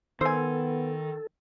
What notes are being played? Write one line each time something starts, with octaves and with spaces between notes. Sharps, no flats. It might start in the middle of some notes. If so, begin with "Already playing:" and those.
D#3 B3 A4 C5 G#5